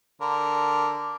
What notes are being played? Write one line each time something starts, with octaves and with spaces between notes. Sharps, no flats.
D3 A#4